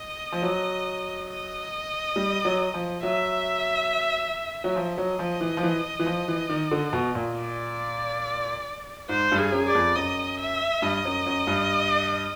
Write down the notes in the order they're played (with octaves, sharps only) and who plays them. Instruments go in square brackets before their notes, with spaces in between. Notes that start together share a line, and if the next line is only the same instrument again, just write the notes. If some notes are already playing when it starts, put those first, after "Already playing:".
Already playing: [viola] D#5
[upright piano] F3
F#3
[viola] D#5
[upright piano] G3
F#3
F3
[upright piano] F#3 [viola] E5
[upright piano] F#3
[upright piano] F3 [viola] D#5
[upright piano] F#3
F3
E3
F3
E3
E3
F3
E3
D#3
D3
B2
A#2
[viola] D5
[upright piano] G#2 [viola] C5
[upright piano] G2
[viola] G#4
[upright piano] F#2
[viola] D5
[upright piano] F2
[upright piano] F#2 [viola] D#5
[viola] E5
[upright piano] G2 [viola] D#5
[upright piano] F#2
F#2
G2